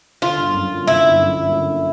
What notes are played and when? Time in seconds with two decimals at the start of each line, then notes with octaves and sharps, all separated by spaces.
0.22 D3 F4
0.38 G1
0.54 F#2
0.71 G1
0.87 D3 E4
1.04 G1
1.20 F#2
1.36 G1
1.53 D3